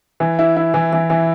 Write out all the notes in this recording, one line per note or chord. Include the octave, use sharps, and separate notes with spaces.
E3
E4
E4
E3
E3
E3